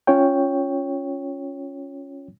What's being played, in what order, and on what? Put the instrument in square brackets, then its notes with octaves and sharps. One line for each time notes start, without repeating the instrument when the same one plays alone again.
[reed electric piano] C#4 F4 C#5 G5